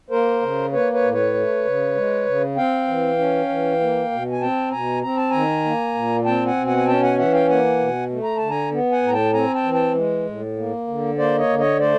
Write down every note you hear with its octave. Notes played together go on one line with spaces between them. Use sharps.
A#3 A#4 C5
C#3
A#3 B4 C#5
B4 C#5
A2
B4 C#5
A3
C#3
G#3
C#3
C4 F5 G5
E3
C#4
E3
A#3
B2
G#5
C4 G5 A5
B2 G#5 A#5
C4 A#5
A5
D#3 G#5 A#5
A#3
A#2
C4 G5 A5
F#5 G#5
B2
F#5 G#5
G#5
C#4 G5 A5
F#5 G#5
E3 E5 F#5
F5 G5
A#3 F#5 G#5
B2
A3
A#5
D3 A5
G#5 A#5
B3
F#5 G#5
A2
A#5
G5 A5
C4 G#5 A#5
G5 A5
E3
G5 A5
G#3
A2
A#3
D3
A#3 C5 D5
C#5 D#5
D3
C#5 D#5
A3 C5 D5